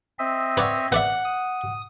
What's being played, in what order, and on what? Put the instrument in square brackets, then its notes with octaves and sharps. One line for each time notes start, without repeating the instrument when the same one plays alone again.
[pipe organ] C4 D#5 E5
[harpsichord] B4 D5 F#5 [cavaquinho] C#5
[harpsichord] B3 D5 E5 [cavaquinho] F#5
[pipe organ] D#6